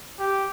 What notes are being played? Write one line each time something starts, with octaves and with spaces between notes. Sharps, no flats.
G4